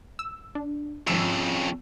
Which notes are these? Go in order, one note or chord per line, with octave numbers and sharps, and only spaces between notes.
E6
D4
G#1 F2 C#3 F3 E6